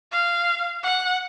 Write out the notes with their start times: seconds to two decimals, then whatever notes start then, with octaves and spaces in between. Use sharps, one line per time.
0.12 F5
0.83 F#5